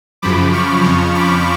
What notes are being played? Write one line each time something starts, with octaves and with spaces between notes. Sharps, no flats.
F#2 C#3 F3 B5 D6
C#6 F6
F2 C#3 F3
B5 D6